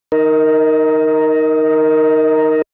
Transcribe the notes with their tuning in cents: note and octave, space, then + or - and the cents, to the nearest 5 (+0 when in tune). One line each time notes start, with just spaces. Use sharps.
D#4 +0 A#4 +0 D#5 +40